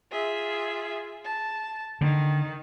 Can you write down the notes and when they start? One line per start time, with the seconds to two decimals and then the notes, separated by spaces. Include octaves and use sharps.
0.11 F4 G#4 E5
1.24 A5
2.01 D3 D#3